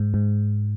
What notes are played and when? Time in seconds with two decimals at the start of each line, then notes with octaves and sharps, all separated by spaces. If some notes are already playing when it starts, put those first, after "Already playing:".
Already playing: G#2
0.14 G#2